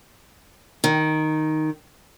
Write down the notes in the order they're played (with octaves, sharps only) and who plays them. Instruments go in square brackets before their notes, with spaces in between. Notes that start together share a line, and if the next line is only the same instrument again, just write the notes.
[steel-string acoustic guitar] D#3